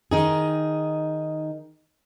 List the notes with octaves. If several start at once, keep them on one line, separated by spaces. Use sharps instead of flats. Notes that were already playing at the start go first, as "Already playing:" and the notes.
D#3 D#4 G#4